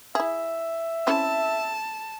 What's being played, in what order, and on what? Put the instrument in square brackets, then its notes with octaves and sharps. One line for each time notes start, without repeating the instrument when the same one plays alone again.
[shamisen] E4 G#4 [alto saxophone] E5
[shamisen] C4 C#4 E4 [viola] A5